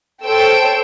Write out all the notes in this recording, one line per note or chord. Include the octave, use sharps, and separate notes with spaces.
A4 C5 C#5 G5 E6 D7